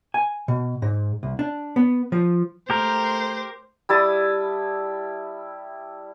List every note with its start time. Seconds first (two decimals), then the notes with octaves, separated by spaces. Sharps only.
0.14 G#5
0.48 B2
0.82 G#2
1.23 C2
1.39 D4
1.76 B3
2.12 F3
2.70 A3 G4 A#4 C5
3.89 G3 E4 A5 D#6